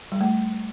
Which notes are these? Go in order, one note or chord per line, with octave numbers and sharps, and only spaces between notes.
G3
A3